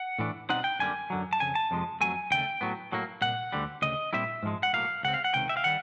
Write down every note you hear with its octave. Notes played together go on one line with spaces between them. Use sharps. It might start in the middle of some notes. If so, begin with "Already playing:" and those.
Already playing: F#5
A2 E3 A3 D4
B2 G3 C4 D#4 F#5
G5
F#2 D3 G3 A#3 G#5
F#2 D3 F#3
A5
F2 C#3 G#5
A5
F2 C3 F3 G#3
F2 C#3 F#3 A3 G#5
D#2 C#3 A3 G5
A2 F#3 B3
A2 F#3 A#3
C2 A#2 F#5
D2 D3 G3
D2 C#3 D#5
A#2 G3 C4 E4 E5
G#2 F3 G#3
F#5
B1 A2 F#3 A#3 F5
C#2 C#3 C4 F#5
F5
F#5
C#2 C3 D#3 G5
E5
F5
D#3 G3 F#5